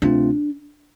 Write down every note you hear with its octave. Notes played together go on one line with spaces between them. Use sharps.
D2 C3 A3 C4 D4 F4